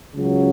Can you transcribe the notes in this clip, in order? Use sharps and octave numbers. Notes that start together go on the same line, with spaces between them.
C#2 C#3 F#3